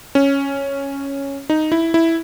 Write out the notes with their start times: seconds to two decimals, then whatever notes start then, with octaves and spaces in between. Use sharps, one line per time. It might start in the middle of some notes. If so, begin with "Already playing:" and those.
0.15 C#4
1.50 D#4
1.72 E4
1.94 E4